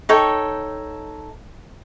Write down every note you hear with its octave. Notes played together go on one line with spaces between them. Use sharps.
D#4 A4 C#5 G5